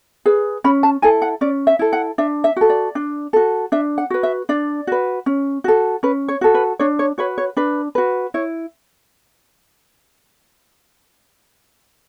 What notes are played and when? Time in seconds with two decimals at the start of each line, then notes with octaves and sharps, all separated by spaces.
0.26 G#4 B4
0.64 C#4 B5
0.83 A5
1.02 E4 A4 G#5
1.22 F#5
1.41 C#4 D5
1.67 E5
1.79 E4 A4
1.93 F#5
2.18 D4 E5
2.44 E5
2.56 F#4 A4
2.70 D5
2.95 D4
3.33 F#4 A4
3.72 D4 E5
3.98 F#5
4.10 F#4 B4
4.23 E5
4.49 D4 D5
4.87 F#4 B4
5.26 C#4
5.64 F#4 A4
6.03 C#4 B4
6.28 C#5
6.41 F#4 A4
6.54 B4
6.79 D4 C#5
6.99 C#5
7.18 F#4 B4 C#5
7.38 C#5
7.57 D4 B4
7.95 F#4 B4
8.34 E4 C#5